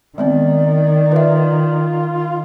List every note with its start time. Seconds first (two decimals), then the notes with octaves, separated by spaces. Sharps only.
0.18 D#3 G#3 B3 C4 D5
1.12 F4 B4 E5